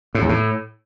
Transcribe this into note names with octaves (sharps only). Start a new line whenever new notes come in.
A2
E2
A2